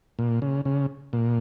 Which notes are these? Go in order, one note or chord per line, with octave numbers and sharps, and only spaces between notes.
A#2
C#3
C#3
A#2